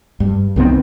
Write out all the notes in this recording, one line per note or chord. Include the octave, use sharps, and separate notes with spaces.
G2
C2 D#3 B3 C4